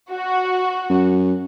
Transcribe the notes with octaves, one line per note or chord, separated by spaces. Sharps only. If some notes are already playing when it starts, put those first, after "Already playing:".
F#4
F#2